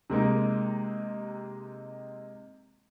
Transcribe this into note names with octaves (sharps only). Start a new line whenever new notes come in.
C3 G#3 A#3 D#4